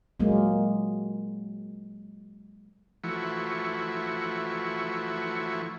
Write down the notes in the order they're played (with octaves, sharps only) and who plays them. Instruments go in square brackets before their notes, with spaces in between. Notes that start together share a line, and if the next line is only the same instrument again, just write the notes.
[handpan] F#3 G#3 A#3
[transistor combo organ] E3 F3 A3 E4 F#4 C#6